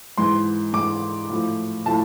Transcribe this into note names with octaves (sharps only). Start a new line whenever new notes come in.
G#2 E3 C6
G#2 E3 D6
A2 F3
A2 F3 A5